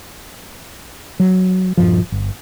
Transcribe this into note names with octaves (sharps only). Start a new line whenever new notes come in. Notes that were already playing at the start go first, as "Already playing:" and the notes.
F#3
D#1 G2 F3
G1